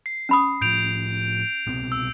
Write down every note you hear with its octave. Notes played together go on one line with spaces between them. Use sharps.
C7
C#4 B5 D#6
A2 F3 G6 D7 F7
C2 B2 C4
E6